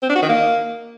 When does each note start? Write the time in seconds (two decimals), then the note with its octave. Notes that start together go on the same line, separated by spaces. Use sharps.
0.03 C4
0.09 D4
0.16 F#4
0.22 D#3
0.29 A#3